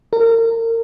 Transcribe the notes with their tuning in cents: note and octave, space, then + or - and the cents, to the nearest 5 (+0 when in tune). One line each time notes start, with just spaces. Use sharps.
A#4 -30